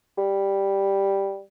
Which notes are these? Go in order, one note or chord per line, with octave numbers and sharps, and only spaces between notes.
G3